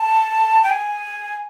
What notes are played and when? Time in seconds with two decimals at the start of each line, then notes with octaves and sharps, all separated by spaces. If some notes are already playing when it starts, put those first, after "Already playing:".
Already playing: A5
0.63 G5
0.70 G#5